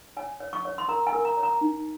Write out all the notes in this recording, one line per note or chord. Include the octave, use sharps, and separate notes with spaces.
C#5 G#5
C#5
C#6
C#5
C6
A#4 A#5
G#5
A#4
A#5
C#5
A#5
D#4